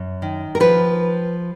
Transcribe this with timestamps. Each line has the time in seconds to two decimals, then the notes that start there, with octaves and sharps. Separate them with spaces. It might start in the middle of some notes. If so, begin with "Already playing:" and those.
Already playing: F#2
0.22 D#3
0.55 A#4
0.60 F3 B4